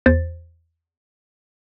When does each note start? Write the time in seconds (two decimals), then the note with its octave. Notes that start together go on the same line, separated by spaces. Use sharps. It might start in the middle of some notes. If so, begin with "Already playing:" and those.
0.06 E2 C5 A6